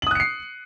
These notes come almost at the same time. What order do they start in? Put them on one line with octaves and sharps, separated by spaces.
F#7 D#6 F#6 C#7 C7